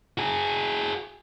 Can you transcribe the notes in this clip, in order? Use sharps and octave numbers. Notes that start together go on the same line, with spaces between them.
F#4 G#4